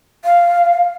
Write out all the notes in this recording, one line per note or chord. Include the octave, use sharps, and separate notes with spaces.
F5